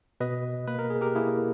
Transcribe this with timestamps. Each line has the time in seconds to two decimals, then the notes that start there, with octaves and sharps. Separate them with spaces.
0.20 B2 B4 D#5
0.67 A#3 B4
0.79 A#4
0.90 G#4
1.01 G4 A#4
1.15 A#3 E4 G#4